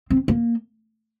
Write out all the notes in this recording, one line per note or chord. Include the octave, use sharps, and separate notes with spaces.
C4
A#3